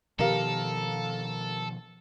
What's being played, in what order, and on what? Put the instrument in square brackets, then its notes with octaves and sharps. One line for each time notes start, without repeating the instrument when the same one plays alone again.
[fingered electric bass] B2 D#3 F3 [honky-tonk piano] G4 A#4 F5 [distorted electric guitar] A4